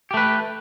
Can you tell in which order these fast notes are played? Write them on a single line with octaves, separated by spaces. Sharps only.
G4 A3 B4